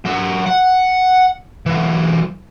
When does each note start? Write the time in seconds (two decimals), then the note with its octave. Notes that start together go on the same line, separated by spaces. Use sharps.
0.06 F#3 E5
0.46 F#5
1.66 E3 F#3